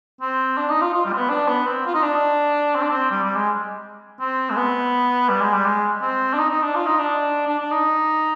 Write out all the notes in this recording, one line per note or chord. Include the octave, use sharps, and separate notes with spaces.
C4
D4
D#4
F4
F4
G3
C4
B3
D4
B3
C4
F4
D#4
D4
C4
D4
C4
G3
G3
G#3
C4
G#3
B3
G3
G#3
G3
G#3
C4
D4
D#4
D#4
D4
F4
D#4
D4
D4
D4
D#4